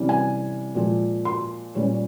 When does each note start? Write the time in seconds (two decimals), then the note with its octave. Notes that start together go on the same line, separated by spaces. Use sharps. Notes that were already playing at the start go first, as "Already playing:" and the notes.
Already playing: C3 E3 G3 C#4
0.09 G#5
0.75 A#2 F3 G#3
1.25 C6
1.75 A#2 G3 C#4 C#5